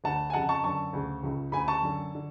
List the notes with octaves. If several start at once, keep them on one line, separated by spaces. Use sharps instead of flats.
D2 D3 F#5 A5
G#5
F2 C#3 F#5 A5
A5 C#6
F#2 D3 A5 C#6
D2 C#3
C#2 C#3
D2 C#3 G#5 B5
A5 C#6
F#2 D3
D3